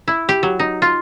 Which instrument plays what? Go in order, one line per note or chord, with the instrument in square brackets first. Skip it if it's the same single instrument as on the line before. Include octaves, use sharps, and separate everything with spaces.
[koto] E4
G4
F#3
D#4
F4